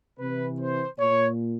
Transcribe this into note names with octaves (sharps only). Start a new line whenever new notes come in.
C3 E3 B4
C5
A#2 C#5